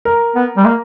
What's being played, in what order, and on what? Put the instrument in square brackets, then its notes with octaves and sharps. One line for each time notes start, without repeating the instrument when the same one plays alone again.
[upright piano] A#4
[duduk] B3
G3
A#3